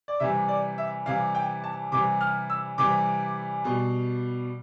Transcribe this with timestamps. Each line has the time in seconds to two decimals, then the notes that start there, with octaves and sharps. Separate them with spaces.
0.08 D5
0.20 C3 E3 G3 E5
0.48 D5
0.78 E5
1.06 C3 E3 G3 F5
1.35 G5
1.64 A5
1.92 C3 E3 G3 D6
2.21 F6
2.50 E6
2.78 C3 E3 G3 D6
3.64 B2 G3